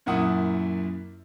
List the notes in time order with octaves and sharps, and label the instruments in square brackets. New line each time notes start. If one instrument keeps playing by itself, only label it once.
[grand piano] F#2 A#2 E4 F#5 D#6